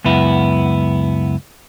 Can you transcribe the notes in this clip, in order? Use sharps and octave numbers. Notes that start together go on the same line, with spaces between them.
C#2 F#2 B3 E4